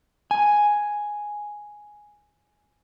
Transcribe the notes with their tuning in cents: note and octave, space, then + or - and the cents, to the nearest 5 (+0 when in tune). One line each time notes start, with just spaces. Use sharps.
G#5 +0